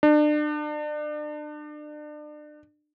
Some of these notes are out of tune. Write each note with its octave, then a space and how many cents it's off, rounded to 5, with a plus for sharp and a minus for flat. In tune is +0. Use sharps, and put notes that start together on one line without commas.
D4 +35